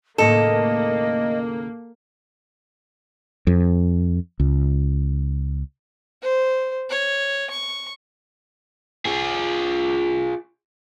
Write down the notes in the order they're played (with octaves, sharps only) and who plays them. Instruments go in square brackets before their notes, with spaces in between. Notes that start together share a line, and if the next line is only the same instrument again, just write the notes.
[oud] D#2 A2 C#3 [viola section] A#3 [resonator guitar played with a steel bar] A4 [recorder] D#5
[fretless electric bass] F2
C#2
[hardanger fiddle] C5
C#5
C#6
[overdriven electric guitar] F4 G#4